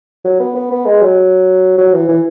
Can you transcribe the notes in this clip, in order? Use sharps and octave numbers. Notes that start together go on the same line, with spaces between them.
F#3
B3
B3
B3
G#3
F#3
F#3
E3
E3